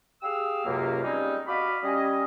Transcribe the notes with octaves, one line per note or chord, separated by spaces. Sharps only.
G4 G#4 F5 E6
C#2 F#2 C3 A#3
G3 G#3 C4 C#4 D#4
F#4 D5 D#5 F5 B5
G3 C#4 D#5